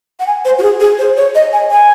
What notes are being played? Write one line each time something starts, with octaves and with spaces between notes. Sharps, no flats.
F#5
G#5
C5
F#4
G#4
G#4
C5
C#5
D#5
G#5
G#5